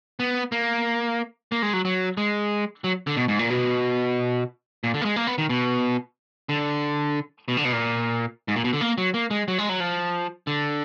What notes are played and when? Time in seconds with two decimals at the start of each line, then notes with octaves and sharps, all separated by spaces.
0.20 B3
0.52 A#3
1.52 A#3
1.62 G#3
1.73 F#3
1.85 F#3
2.17 G#3
2.84 F#3
3.07 D3
3.17 B2
3.28 G#2
3.39 A#2
3.50 B2
4.84 A#2
4.94 D3
5.01 A#3
5.05 G#3
5.16 A#3
5.27 B3
5.38 D#3
5.49 B2
6.49 D3
7.48 B2
7.57 D3
7.65 B2
7.73 A#2
8.48 G#2
8.56 A#2
8.64 B2
8.73 D3
8.81 A#3
8.98 F#3
9.14 A#3
9.31 G#3
9.48 F#3
9.58 G#3
9.69 F#3
9.80 F3
10.47 D3